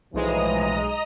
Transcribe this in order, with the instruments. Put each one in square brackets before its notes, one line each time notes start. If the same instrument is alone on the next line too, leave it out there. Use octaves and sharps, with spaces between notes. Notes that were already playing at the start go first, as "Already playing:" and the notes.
[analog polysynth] B1 G#3 [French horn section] A2 E3 F3 [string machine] D#5 A#5 D#6